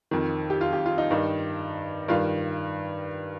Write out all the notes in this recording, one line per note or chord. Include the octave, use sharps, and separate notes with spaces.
F2 D#3
G4
F4
G4
F4
D#4
G2 D#3
G2 D#3 F4